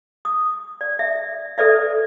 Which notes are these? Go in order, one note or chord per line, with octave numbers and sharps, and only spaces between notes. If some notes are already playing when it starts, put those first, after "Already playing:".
D#6
D5
E5
A4 B4 D5 E5